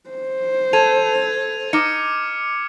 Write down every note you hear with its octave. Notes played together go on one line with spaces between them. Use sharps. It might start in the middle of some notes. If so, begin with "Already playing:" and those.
C5
A4 G#6 D#7 F7
D#4 D6 F6 C#7